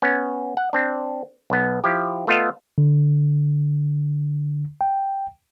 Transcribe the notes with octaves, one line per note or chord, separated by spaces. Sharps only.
B3 C#4
F#5
C4 D4
B1 B3
F3 E4 G4
A3 B3 F4 A4 D#5 F5
D3
G5